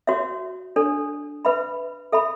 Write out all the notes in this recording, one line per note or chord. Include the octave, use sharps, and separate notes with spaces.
F#4 C#5 E5
D4 A4 C#5
B4 E5 B5
A4 E5 B5